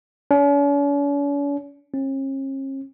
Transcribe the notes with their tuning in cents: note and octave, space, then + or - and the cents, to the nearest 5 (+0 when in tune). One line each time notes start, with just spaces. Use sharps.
C#4 +45
C#4 -45